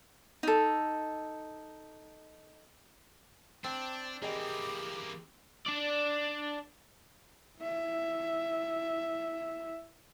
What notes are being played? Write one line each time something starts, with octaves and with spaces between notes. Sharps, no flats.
D#4 A4
C4 D4 G5
E3 A#3 G4 G#4 D#5 G5
D4 D5
E4 E5